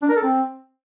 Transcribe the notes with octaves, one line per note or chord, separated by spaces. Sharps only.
D4
A#4
A4
C4